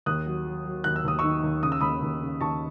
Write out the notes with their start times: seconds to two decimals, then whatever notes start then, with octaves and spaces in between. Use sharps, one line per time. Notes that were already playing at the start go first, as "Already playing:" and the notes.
0.06 D#2 D#6 F#6
0.26 F#3
0.46 F#3
0.66 F#3
0.84 D#2 F#6
0.96 E6
1.05 D#2 D#6
1.19 D#3 C#6 E6
1.43 D#2
1.63 C#3 D#6
1.72 E6
1.81 D#2 B5 D#6
2.02 D#2
2.22 C#3
2.41 D#2 A5 C#6